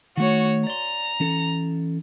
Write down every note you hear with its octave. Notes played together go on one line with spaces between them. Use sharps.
D#3 A3 F#4 C#5
D5 A#5 C6
E3 C#4 A4